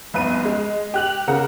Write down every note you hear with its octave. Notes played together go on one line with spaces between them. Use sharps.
F1 C2 B3 D#7
G#3
G4 F#6 F#7
C#3 A#4 F#5